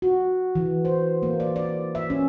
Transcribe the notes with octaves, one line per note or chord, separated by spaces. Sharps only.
F#4
E3
C5
A#3
D5
D5
E5
C#4